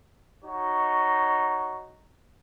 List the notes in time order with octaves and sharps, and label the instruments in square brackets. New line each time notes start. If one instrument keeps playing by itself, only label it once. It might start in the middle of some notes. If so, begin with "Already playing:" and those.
[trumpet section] D#4 F#4 C#5